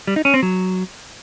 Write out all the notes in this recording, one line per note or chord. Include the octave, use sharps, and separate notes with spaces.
G3
D#4
C#4
C4
F#3